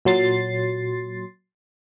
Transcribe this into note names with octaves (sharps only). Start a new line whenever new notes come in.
A#2 F#3 C6 A6 C7